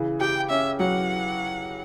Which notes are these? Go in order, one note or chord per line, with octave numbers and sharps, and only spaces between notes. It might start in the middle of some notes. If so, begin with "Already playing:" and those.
Already playing: C#3 E3
G4 G5
C#4 E5
F#3 F#5